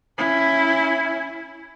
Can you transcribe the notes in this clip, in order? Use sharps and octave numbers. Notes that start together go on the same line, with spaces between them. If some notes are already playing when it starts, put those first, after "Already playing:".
C#4 E4